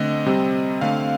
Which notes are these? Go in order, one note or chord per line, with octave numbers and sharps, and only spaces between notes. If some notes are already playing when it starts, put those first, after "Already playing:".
Already playing: D3 A3 C4 D#5
C3 G3 C4
D3 A3 C4 F5